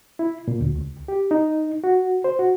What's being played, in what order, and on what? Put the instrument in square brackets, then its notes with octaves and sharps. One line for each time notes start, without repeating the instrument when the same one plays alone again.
[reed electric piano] E4
A#2
D2
C#2
G4
D#4
F#4
C5
F#4